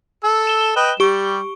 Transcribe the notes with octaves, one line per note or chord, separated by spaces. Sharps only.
A4 E6
E7 G7
B4 D#5 G5
G3 G4 C#6